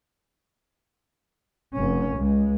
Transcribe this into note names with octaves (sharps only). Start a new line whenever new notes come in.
F1 C#4
C#2 G#3